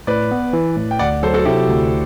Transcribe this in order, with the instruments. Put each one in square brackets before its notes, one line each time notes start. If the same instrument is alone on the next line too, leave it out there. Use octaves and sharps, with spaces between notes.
[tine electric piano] A2 [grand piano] B4 D5
[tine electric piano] B3
E3
A2
[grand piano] G5
[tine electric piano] D2 [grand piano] D5 F#5
[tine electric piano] F#3 [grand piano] A4 C5
[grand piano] F#4 A4
[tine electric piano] C3 [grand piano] E4 G4
[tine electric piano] D2